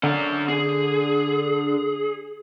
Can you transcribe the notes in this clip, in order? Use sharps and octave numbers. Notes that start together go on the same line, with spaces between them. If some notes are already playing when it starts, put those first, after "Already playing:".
D3 C#4 F#5
G#4